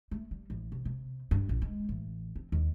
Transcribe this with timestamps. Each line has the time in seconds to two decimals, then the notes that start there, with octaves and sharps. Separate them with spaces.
0.11 A3
0.31 G3
0.50 A1
0.72 C3
0.85 C3
1.31 G2
1.49 A#1
1.62 G#3
1.89 A1
2.36 C4
2.52 D#2